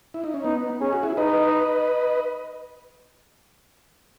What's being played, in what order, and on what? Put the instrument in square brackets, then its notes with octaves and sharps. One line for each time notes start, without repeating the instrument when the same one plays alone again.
[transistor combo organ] E4
D#4
C#4
[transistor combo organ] B3 [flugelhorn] D#4
[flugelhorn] C#4 [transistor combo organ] G#4
[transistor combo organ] F#4
E4 G#4
[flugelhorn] D#4 [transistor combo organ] B4 D#5